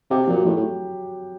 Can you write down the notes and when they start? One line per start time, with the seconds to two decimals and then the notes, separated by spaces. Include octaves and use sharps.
0.10 C3 G4
0.27 A#2 F#3
0.45 A2 F#3
0.56 A2